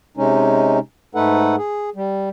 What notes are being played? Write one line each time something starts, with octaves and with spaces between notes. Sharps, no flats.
C3 G#3 C#4 D#4
G#2 A3 D#4 A4 B4 F#5
G#4
G3